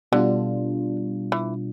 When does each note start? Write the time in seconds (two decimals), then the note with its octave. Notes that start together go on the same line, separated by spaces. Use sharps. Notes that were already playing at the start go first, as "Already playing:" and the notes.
0.12 B2 D3 G3 D4 F4
1.32 E3